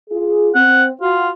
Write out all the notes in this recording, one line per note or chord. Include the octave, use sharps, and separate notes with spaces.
F4 G#4
C4 F#5
F4 F#4